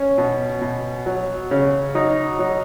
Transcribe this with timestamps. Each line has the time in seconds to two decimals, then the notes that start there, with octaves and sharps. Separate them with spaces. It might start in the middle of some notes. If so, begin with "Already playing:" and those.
Already playing: C#4
0.18 B2
0.61 B2
1.06 F#3
1.51 C#3
1.95 F#3 D#4
2.39 F#3